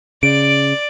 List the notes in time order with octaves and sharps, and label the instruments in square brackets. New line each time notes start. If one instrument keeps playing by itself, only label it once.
[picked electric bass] C#3 [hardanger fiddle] D5 [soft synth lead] D7